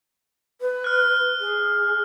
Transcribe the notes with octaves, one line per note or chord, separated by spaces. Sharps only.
B4
F6 F#6
G#4